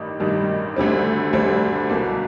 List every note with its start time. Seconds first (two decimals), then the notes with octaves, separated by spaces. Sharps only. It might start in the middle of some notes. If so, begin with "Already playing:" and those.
Already playing: A1 G2 D#3 G3
0.20 A1 G2 D#3 G3
0.77 D2 D3 G3 C4
1.33 D2 D3 G3 C4
1.90 C2 B2 F#3 A#3